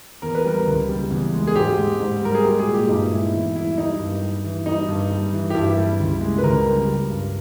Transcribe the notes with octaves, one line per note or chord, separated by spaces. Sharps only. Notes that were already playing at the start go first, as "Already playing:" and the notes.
E2 A#4
B4
G3 A#4
C#2
G3
E2
G#3
G#4
G#2 G4
G#3
G#2
G3 A#4
G#4
G#3 G4
G#4
A#2
G4
G2 D#4
G#3 E4
E2 E4
G3 E4
G3 D#4
G2
G3
E3
G3 D#4
G2
G3
E3
G4
G2 E4
G3
C#2
G#3
B4
C#2 A#4
G3
G3
G2